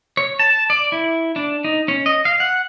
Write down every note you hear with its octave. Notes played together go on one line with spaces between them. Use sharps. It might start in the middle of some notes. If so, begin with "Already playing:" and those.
C#5
A5
D5
E4
D4
D#4
C#4
D#5
F5
F#5